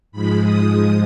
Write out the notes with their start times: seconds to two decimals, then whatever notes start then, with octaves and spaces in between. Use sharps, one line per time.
0.12 G#2 F3 G#3 B5
0.42 D#6